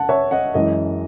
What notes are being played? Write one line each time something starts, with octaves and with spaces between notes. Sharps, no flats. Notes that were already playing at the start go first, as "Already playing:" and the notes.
Already playing: F#5 A5
C#5 E5
D#5 F#5
F#2 E3 G#3 D#5